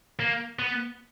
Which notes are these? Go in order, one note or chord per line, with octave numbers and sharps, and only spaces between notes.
A#3
B3